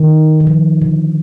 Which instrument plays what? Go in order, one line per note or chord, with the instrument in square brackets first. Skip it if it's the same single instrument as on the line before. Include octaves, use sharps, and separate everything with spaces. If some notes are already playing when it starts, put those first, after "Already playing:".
Already playing: [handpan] D#3
D#3
F3
D3